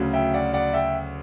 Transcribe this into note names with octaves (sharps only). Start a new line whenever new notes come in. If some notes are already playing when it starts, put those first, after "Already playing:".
Already playing: D2 C#3 F#3
E5 G5
D5 F#5
D5 F#5
E5 G5